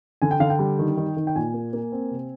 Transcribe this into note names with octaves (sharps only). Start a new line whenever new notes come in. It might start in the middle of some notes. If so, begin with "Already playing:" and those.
D3 G#5
G5
D3 F5
G5
G3
D#3
D#3
D#3
G5
A#2 G#5
A#3
A#3
C4
C3